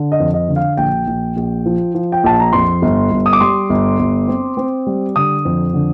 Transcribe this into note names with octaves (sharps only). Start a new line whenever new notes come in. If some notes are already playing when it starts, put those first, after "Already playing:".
Already playing: D3
D#5
F2
D#5
D3
F5
A#1 G5
A#1
A#1
F3
F3
G5
A#1 A5
A#5
F2 C6
G1
G1
D#6
D6
G3 C6
G1
G1
C4
C4
G3
D3 D#6
F2
D3